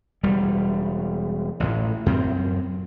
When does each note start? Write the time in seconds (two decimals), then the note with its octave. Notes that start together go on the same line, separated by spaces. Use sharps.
0.23 E1 G3
1.60 A1 A2
2.06 F#2 C4